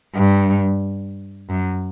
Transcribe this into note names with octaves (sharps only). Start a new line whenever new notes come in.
G2
F#2